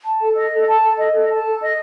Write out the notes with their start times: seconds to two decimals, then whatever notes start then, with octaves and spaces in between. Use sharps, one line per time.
0.05 A5
0.21 A4
0.36 D#5
0.51 A4
0.67 A5
0.83 A4
0.98 D#5
1.14 A4
1.30 A5
1.45 A4
1.61 D#5